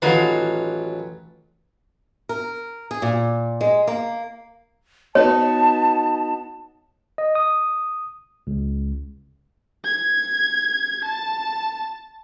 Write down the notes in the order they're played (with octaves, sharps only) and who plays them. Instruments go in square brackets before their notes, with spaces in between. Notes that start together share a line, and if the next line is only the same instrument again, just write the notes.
[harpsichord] A1 B4 [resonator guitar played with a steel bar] D#3 F#3 F4
[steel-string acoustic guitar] A#4
G#4
A#2
G#3
A#3
[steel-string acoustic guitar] B3 D#4 F#4 [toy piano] C#5 [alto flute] A5
[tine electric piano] D#5
D#6
C#2
[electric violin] G#6
A5